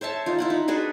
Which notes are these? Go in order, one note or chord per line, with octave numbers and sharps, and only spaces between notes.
C5 C#5 E5 A5
D#4 F4
E4 F4 F#5
D#4
D4 F#4 G#4 B4